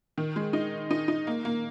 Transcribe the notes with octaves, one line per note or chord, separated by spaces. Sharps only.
D#3
G#3
D#4
D#4
D#4
A#3
A#3